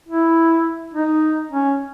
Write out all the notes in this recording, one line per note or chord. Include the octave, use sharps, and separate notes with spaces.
E4
D#4
C#4